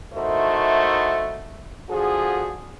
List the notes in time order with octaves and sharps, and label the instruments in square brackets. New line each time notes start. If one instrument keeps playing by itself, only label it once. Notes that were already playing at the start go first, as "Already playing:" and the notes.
[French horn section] A3 D#4 E4 F#4 A#4 C5
D3 F3 F#4 G#4